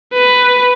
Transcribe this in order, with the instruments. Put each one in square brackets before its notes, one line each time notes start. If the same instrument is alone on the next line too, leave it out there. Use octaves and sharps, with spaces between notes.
[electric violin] B4